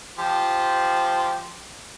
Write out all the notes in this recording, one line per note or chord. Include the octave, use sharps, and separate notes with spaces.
F3 G4 C5